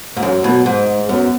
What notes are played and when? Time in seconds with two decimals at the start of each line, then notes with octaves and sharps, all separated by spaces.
0.17 G#2
0.23 F#2 F#3
0.44 B2
0.66 G#2 G#3
1.09 F#2 B3